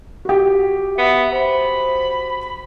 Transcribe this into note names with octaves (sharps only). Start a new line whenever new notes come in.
F#4 G4
B3 E5
C5 B5